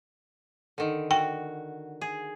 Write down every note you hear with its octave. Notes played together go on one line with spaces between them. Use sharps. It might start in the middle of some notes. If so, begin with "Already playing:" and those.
D3 D#3
F#4 G5
G#4